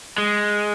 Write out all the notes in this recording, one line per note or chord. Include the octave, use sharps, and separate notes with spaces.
G#3